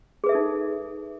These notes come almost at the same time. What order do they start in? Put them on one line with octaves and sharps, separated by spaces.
G#4 B4 E5 A4 D#4